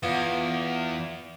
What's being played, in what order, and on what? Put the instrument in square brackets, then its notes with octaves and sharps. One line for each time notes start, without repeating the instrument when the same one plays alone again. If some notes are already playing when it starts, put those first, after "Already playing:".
[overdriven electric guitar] E2 [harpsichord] B3 F4